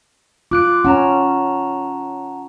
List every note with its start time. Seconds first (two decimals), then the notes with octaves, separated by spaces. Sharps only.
0.51 F4 D6 F#6 D7
0.85 C#4 F#5 A5 A#5